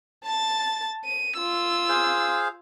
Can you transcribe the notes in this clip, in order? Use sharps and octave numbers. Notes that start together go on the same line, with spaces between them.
A5 A6
D#7
F4 E6
G#4 C5 F5